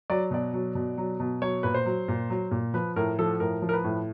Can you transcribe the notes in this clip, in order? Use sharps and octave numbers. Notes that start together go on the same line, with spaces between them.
F#3 D5
B2 D5
F#3
B2
F#3
B2
F#3 C#5
A#2 B4
C5
F#3
A#2
F#3
A#2
F3 B4
A2 A#4
F3 A4
A2 A#4
F3
A#4
B4
A2